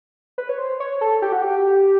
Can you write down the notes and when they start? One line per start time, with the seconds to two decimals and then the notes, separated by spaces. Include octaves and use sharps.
0.38 B4
0.49 C#5
0.58 C5
0.80 C#5
1.01 A4
1.22 G4
1.32 F#4
1.42 G4